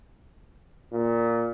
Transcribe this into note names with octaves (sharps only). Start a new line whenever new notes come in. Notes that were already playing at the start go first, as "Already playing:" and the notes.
A#2